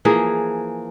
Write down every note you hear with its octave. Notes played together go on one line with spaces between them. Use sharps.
E3 F3 A#3 G#4